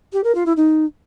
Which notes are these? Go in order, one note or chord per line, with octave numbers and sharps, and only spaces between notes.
G4
A#4
F4
E4
D#4